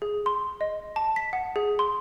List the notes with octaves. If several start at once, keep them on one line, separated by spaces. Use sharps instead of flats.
G#4
C6
D#5
A5
B6
F#5
G#4
C6